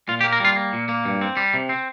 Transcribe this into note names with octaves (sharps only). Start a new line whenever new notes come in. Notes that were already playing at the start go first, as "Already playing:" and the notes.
A#2 F4
G4
A#3
A#4
G3 F4
A#3
A#2
A#3
G2
C4
G3
C3
C4